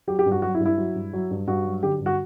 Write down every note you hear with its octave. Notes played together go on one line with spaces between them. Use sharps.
F#3 G4
G4
G2
F#4
F#3 F#4
E4
G2
E4
F#3
G2
F#3
G2
G2 F#4
F#3
D3 G4
G2
F#4